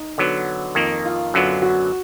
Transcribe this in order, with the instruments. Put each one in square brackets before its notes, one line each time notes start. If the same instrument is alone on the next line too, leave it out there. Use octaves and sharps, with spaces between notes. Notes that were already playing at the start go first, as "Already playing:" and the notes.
Already playing: [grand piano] D#4
[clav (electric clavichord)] D3 F#3 B3
F2 D#3 A#3
[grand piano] F4
[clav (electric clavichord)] F#2 D3 F#3 B3
[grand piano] F#4